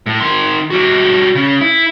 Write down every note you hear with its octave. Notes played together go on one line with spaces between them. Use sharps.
A2
D#3 C6
G3 F#4
C#3
E4